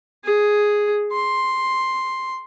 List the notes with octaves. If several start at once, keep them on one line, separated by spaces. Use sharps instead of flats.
G#4
C6